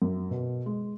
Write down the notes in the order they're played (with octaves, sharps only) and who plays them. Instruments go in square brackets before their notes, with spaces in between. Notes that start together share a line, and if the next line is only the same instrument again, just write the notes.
[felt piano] F#2
B2
G#3